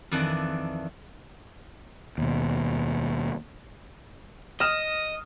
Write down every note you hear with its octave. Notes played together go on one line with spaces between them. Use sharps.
F2 D#3 E3 D4 D5
D#2 B2
D#5 D#6 F6 E7